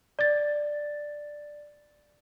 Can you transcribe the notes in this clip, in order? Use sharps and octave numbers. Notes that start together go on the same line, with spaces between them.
D5 A6